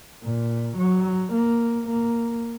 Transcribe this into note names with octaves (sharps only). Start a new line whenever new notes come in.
A#2
F#3
A#3
A#3